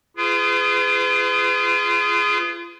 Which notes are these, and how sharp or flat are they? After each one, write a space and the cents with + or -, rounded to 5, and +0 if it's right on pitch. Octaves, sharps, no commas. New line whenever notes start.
F4 -35 G#4 +0 B4 +35